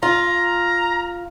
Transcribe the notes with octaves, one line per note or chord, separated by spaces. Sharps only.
F4 A#5